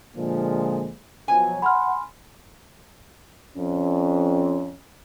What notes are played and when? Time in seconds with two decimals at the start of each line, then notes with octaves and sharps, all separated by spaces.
0.16 A#2 D3 F3 G#3
1.28 B2 F3 F#3 G#5
1.62 F#5 B5 C6 F6
3.56 F2 C#4